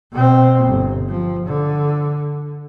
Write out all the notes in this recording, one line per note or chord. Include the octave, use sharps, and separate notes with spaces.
B2 C4
G1
F3
D3